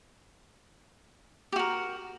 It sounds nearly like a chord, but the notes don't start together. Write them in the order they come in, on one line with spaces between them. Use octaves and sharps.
G4 F#4 A#4